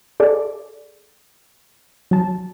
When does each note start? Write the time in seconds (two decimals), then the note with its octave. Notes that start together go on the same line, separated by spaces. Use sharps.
0.20 G#4 A4 D5
2.11 F#3 A5